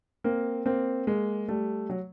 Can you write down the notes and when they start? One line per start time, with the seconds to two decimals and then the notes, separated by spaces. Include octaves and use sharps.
0.24 A#3 C4
0.66 A#3 C4
1.07 G#3 A#3
1.48 G3 A3
1.90 F#3